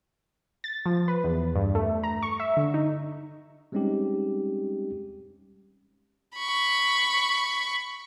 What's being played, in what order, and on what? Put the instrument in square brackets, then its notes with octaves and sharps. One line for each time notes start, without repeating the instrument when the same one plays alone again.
[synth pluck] A6
F3
B4
E2
G2
A3
A#5
C#6
E5
D3
D#4
[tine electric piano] G3 G#3 C4 C#4 D#4 G4
[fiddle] B5 C#6